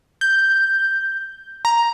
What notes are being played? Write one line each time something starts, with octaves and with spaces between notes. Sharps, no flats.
G6
A#5